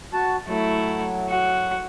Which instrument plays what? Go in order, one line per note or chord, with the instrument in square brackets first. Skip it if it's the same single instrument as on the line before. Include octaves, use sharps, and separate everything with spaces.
[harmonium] F#4 A5
[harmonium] F#3 [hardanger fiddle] A3 E4
[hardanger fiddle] F#4